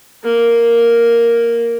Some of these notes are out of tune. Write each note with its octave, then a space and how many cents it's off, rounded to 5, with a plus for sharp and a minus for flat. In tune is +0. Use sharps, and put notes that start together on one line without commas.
A#3 +0 A#4 +0